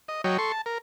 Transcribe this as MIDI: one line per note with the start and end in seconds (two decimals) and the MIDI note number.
0.08 0.22 75
0.24 0.37 54
0.24 0.37 73
0.24 0.37 75
0.24 0.37 79
0.38 0.52 69
0.38 0.52 84
0.38 0.52 85
0.52 0.61 81
0.66 0.78 70